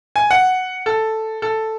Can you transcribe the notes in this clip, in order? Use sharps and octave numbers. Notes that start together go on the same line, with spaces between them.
G#5
F#5
A4
A4